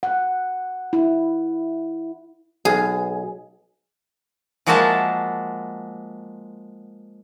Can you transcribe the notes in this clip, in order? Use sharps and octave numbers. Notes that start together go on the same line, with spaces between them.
F#5
E4
B1 G#4
F3 G#3 A#3 F#4 E5 A5